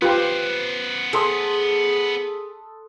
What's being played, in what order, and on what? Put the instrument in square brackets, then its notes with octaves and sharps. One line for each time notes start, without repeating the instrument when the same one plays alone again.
[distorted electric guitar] B3 C5 [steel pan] F4 G4 [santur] B4
[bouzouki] G#4 [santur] A4 C6 D#6